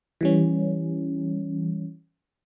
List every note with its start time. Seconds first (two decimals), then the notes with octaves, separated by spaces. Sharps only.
0.21 E3 G3 C#4